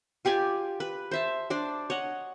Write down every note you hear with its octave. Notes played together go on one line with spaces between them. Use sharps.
F4 G4 D5 G#5
B4
C5 E5 A5
D4 C5 D5
C#5 D#5 F#5